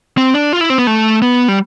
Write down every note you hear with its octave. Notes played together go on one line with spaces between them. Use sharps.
C4
D4
F4
E4
C4
B3
A3
B3
G3